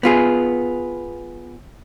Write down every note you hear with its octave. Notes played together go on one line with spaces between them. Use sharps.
B3 F4 G#4